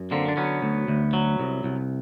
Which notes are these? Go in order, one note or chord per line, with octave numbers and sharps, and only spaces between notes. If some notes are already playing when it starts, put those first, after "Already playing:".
Already playing: F#2
D3 A#3 C4
D4
F#3 B3 C#4
D2
D2
F#3
C2
C2